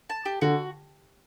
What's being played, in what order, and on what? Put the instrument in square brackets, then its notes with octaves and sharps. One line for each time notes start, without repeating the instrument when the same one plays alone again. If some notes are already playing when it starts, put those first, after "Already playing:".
[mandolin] A5
G4
[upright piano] D3 [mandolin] F#4